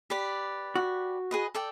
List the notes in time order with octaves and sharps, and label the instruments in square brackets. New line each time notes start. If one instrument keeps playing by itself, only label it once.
[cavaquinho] G4 B4 D5
[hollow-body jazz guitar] F#4
[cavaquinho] G#4 B4 D#5
A4 D5 G5